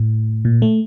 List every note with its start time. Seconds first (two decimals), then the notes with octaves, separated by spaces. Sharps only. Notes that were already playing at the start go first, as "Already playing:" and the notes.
Already playing: A2
0.45 A#2
0.62 A3